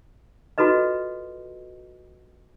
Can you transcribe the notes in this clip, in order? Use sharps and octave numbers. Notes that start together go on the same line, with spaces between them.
F4 F#4 A4 B4 D#5